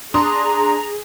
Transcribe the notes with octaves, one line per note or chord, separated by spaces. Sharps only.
D4 G#4 A#5 C6 D#6